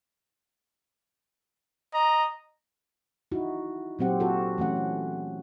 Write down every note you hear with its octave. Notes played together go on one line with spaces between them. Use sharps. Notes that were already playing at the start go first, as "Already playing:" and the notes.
D#5 A#5
D#4 E4 F#4
A#2 F#3 C4 G4 F#5
F4 F#4 A4
E3 A3 C#4 F#5
A3